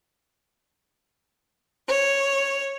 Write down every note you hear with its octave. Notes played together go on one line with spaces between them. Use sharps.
C#5